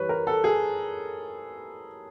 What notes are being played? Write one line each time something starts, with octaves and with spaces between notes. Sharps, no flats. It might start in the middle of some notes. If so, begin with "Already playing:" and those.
Already playing: E3 G3 B4 C#5
A#4
A4
G#4